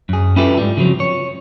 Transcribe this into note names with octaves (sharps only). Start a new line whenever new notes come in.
F#2 G#4
C#4 E4 F4 G4 A4 B4
G#2 G3
C#3 F3 F#3 C4
C#5